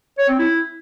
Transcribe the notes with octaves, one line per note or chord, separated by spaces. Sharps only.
C#5
C4
E4